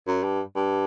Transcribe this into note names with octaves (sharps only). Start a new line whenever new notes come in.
F#2
G2
G2